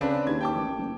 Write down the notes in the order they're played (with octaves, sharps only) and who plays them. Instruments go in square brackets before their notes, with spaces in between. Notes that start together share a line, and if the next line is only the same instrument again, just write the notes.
[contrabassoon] C#3 [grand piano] C4 D4 B4
[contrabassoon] D#2 [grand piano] G#6
[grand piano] G5 A5 D6
[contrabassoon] A1
F#1